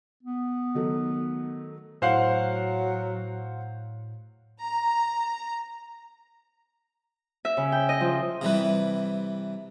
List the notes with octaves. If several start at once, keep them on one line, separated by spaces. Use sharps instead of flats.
B3
D#3 F#3 A3
A2 F#3 C5 F5 F#5
A#5
E5
C#3
G5
D#5
F3
C3 E3 G3 B4